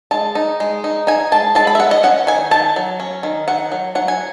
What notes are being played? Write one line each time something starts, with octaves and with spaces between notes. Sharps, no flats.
G#3 A5
D#4
G#3
D#4
D#4 G#5
G#3 A5
G#3 A5
B5
E5
B3 F#5
D#5
C#4 F#5
D#3 G#5
D#3 A5
F#3
C#4
D#3
D#3 F#5
F#3
F#3 F#5
G#5